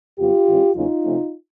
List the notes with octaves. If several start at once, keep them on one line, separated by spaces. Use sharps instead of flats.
F2 C#3 F#3 B3 F4 G4
A2 E3 G#3 C#4
E2 C#3 F#3 A#3 C#4 D#4 F4
C3 F3 A3 C#4